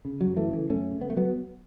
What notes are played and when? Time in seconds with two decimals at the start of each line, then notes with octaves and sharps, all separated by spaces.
0.05 C#3
0.21 F#3
0.27 F#2
0.37 E3 A3
0.49 C#3 E3
0.70 F#2 A3 C#4
0.91 C#3
1.01 B3
1.10 A3
1.17 F#3 B3